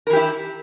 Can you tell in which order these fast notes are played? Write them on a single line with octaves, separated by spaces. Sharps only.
A#4 E3 G4 E4